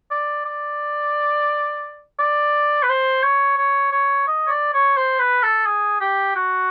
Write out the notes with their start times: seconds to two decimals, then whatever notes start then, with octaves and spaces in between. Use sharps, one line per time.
0.11 D5
0.45 D5
2.19 D5
2.83 B4
2.89 C5
3.23 C#5
3.57 C#5
3.92 C#5
4.28 D#5
4.47 C#5
4.50 D5
4.74 C#5
4.97 C5
5.19 B4
5.43 A4
5.66 G#4
6.01 G4
6.36 F#4